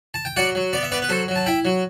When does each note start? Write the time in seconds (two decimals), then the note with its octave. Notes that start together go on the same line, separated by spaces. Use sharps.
0.14 A5
0.25 G5
0.36 F#3 D5 F#5
0.55 F#3
0.73 B3 D5
0.83 E5
0.92 B3 B4 D5
1.02 B4
1.09 F#3 A4 C5
1.28 F#3
1.36 A5
1.46 E4 E5 G5
1.65 F#3